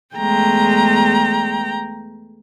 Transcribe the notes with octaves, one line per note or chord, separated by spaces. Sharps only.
E2 G#3 A3 G5 A#5